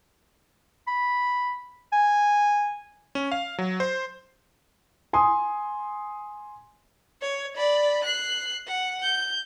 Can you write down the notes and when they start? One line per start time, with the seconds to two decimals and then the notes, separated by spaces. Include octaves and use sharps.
0.87 B5
1.92 G#5
3.15 C#4
3.32 F5
3.58 F#3
3.80 C5
5.13 G#5 C6 D#6
7.22 C#5
7.57 D5 B5
8.04 F#6 C7
8.67 F#5
9.03 G6